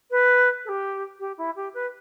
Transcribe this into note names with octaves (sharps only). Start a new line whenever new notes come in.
B4
A4
G4
G4
E4
G4
B4